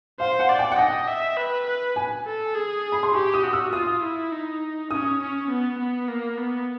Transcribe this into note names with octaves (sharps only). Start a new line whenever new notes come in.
C5 F5
F#5
D5
G5
F#5
D#5 G5
E5
B4
B4
G#5
A4
G#4
B5
C6
G4 C#6
D#6
F#4
E6
F4 D#6
E4
D#4
C#4 D#6
C#4
B3
B3
A#3
B3